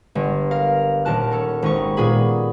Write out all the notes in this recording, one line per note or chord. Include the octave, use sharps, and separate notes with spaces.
G1
A#4 F5
D#1 A#4 A5 F#6
C#4 A4
G#1 D#4 C#6
A#2 B3 G#4 B5